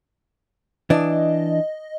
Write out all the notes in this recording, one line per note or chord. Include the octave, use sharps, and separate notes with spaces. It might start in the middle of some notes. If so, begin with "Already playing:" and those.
E3 D4 D#5